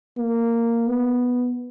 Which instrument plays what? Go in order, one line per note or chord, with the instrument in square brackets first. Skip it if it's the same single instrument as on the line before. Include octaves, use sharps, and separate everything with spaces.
[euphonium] A#3
B3